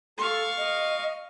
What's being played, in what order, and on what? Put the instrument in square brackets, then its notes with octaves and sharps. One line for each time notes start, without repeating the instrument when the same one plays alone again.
[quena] A4 [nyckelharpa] F5 C#6
[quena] D#5